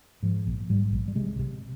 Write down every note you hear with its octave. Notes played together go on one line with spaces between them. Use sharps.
G#2 F3
A#1
G#2 G3
A#1
G3
C3 G#3
C3